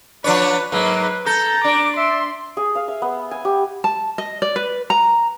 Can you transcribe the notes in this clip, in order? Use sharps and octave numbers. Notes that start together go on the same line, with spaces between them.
F3 D4 B4 C#5
G#2 F#3 A#3 B4
A4 A#5 G6
D4 D6 D7
E5 C6
G#4
F5
E5
B3
G#5
G4
A5
D#5
D5
B4
A#5